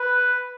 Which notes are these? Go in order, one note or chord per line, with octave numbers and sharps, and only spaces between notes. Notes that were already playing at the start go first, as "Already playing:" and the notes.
Already playing: B4